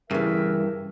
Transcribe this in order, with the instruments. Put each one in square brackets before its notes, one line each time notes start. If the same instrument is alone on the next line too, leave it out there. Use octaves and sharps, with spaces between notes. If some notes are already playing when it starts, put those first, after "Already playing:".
[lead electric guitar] G2 [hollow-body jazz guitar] C#3 E3 [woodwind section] A#4 E5